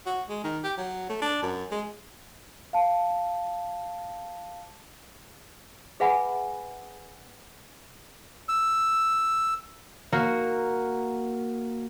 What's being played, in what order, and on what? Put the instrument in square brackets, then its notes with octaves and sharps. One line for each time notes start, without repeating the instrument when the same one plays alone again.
[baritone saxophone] F#4
G#3
D#3
G4
F#3
A3
D4
F#2
G#3
[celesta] F5 A5
[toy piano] G#4 B4 E5 F#5 G#5 B5
[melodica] E6
[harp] A#3 F#4